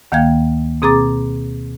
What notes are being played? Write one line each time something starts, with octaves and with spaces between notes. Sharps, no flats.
D2 D#3 A#3 F5 G5 G#6
B2 C4 G#4 A#5 D6 A6